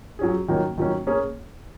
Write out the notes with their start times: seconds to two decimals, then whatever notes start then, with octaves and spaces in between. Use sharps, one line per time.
0.19 F#3 C#4 G#4
0.48 D#3 F#3 A#3 C#4
0.78 D#3 F#3 A#3 C#4
1.07 A#3 C#4 G#4 C#5